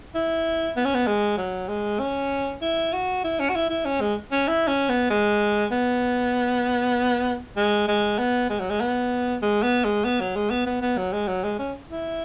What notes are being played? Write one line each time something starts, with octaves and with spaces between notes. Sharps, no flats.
E4
B3
C#4
B3
G#3
F#3
G#3
C#4
E4
F#4
E4
C#4
F#4
E4
E4
C#4
G#3
C#4
E4
C#4
B3
G#3
B3
G#3
G#3
B3
G#3
F#3
G#3
B3
G#3
B3
G#3
B3
F#3
G#3
B3
B3
B3
F#3
G#3
F#3
G#3
C#4
E4